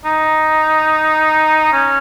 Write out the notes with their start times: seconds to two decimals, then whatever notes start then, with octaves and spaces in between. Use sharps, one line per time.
0.05 D#4
1.72 C#4